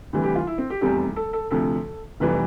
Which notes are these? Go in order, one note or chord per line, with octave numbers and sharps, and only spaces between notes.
D2 C3 E3 G3
G4
F4
E4
C4
G4
F1 E2 C3 G3 G4
A4
A4
D2 C3 F3 A4
F1 F2 E3 G3 B4